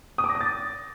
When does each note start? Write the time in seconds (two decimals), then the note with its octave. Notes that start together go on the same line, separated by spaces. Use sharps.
0.18 D#6
0.24 D6
0.30 A#6
0.35 D#6
0.41 A6